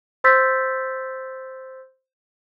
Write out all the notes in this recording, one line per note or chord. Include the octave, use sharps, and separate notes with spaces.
C5 C6 E6 G6 A6 B6